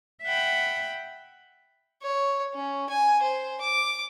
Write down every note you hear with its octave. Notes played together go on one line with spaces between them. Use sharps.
E5 F#5 G5 B5
C#5
C#4
G#5
C5
D6